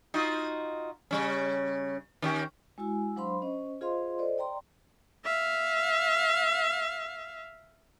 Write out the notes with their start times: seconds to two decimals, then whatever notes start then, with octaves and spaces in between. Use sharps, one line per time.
0.14 D#4 F4 F#4
1.11 C#3 G3 C#4
2.22 D#3 C#4 G4
2.78 G#3 E4 F#4 G#5 E6
3.16 F#3 D4 C5 F5 B5 C6
3.42 C#4 C5 D#5
3.81 F4 G#4 C5 D#5 F5 C6
4.18 A4 C5 D5 D#5
4.38 D5 G5 A#5 C6
5.25 E5 F5